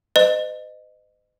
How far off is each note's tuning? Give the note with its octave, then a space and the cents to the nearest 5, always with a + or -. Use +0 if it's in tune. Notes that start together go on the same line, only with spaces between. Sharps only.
C5 -45 D#5 -20